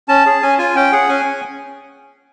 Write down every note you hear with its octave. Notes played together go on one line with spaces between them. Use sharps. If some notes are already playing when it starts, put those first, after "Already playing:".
C#4 A5
G#4
C#4 G#5
F4 G#5
C#4 G5
G#4 F#5
C#4 G#5
C#4